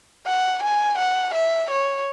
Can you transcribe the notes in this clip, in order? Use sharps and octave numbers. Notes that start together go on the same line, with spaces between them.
F#5
G#5
F#5
E5
C#5